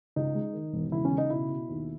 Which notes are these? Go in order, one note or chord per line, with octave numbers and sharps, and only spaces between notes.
C#2 D#4
G#3
D#3
E1
C#3 E4
C#4
C#3
D#4
B2 E4
B2
D#2